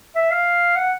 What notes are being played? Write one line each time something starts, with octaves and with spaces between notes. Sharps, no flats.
E5
F5
F#5